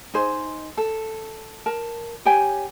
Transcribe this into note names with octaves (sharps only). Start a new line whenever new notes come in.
D#4 G#4 C5
A4
A#4 A5
G4 C#5 G5 G#5